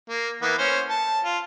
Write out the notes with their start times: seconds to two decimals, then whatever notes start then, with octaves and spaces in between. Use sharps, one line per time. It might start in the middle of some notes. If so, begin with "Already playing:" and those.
0.09 A#3
0.42 E3 A#3 B3
0.58 C#4 C5
0.90 A5
1.24 F4